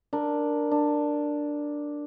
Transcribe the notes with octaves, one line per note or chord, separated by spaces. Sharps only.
D4 A#4
D4